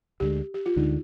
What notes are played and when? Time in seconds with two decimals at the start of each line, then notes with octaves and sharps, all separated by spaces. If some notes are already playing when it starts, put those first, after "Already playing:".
0.20 D2 D3 G#3 G4
0.54 G4
0.66 F4
0.76 D2 D3 G#3 D#4